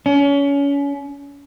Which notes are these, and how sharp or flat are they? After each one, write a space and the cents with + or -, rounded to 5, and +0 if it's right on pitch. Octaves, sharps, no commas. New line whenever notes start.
C#4 +30